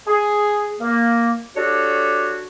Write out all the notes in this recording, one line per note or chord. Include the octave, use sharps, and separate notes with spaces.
G#4
A#3
D4 F#4 G4 A4 C#5